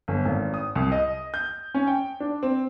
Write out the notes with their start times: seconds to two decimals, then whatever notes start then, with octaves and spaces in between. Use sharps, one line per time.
0.08 G1
0.25 G#1
0.54 D#6
0.75 C2
0.92 D#5
1.34 G6
1.75 C#4
1.87 G5
2.20 D4
2.43 C4